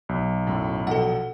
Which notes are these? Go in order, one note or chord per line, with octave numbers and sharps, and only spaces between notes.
B1
F#2 A2
A#1 B2 A4 F#5